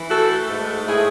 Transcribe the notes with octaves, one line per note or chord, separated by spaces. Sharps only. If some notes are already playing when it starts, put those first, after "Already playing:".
Already playing: E3
A3 F#4 A4
G#2
A2 E4 G#4